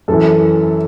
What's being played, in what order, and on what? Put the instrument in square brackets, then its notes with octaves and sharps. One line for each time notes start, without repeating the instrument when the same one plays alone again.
[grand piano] F#2 E3 A4